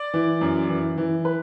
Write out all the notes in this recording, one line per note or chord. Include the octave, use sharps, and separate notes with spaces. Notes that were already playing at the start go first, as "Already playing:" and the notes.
Already playing: D5
E3
F#2
E3
E3
B4